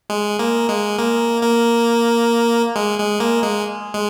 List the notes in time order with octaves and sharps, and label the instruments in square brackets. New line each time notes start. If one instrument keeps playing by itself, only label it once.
[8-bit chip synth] G#3
A#3
G#3
A#3
A#3
G#3
G#3
A#3
G#3
G#3